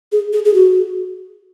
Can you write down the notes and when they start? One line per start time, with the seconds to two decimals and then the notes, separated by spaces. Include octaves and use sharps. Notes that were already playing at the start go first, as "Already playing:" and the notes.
0.12 G#4
0.33 G#4
0.45 G#4
0.54 F#4